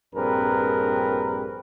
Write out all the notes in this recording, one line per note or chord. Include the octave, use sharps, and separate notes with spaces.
A#1 G2 C4 G#4 A#4 B4